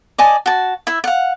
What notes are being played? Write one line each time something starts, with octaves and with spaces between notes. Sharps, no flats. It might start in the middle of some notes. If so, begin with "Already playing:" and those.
D5 D#5 G#5 A5
F#4 A5
E4 E5
F5 F#5